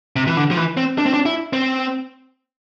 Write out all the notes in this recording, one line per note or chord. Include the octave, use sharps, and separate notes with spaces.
C3
E3
D3
F3
E3
C4
D4
C4
D4
E4
C4